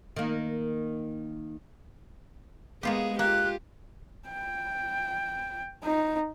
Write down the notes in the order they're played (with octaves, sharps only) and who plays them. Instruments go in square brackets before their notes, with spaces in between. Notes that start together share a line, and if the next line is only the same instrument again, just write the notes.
[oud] D#3 A#3
[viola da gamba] G#3 B3 G#4 [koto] A#3 F4 G4
[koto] A#3 [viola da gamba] F4 G4 [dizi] F#6
[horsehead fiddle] G5
D#4